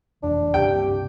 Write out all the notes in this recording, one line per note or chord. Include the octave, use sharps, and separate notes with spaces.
F#1 F2 E3 D4
C#2 G2 C3 G4 G5